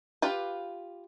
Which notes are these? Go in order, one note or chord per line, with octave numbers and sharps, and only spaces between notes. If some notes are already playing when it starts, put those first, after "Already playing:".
F4 G4 B4